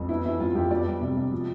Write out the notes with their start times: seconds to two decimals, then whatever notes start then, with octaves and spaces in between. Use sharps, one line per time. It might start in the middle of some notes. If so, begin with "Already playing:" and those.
Already playing: F2
0.09 B3 E4
0.25 E3 E4
0.40 F2 F4
0.55 F2 G4
0.71 B3 D5
0.86 G3
1.01 C3
1.17 C3
1.32 F3